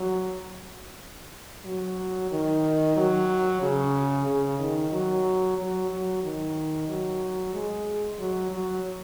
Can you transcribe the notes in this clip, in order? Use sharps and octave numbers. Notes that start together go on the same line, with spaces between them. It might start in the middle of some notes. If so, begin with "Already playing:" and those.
Already playing: F#3
F#3
D#3
F#3
C#3
C#3
D#3
F#3
F#3
F#3
D#3
F#3
G#3
F#3
F#3